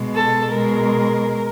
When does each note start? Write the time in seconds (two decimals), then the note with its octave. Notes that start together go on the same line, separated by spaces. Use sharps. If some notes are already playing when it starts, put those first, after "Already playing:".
Already playing: B2 G#3
0.15 A4
0.52 B2 G#3 A#4